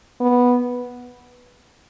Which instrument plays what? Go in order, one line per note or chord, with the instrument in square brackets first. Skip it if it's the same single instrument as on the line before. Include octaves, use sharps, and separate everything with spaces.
[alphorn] B3